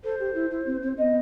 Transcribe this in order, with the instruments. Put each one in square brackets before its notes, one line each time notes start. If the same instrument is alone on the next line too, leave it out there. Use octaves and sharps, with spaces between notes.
[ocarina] A4 [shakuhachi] C5
[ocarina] G4
E4
E4
C4
C4
[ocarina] B3 C4 [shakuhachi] D#5